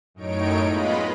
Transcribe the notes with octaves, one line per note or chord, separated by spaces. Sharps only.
F#2 A2 D#4 C#5 D7
G#3 B3 F4 D#5 B5